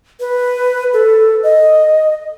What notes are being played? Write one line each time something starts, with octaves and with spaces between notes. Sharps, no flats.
B4
A4
D#5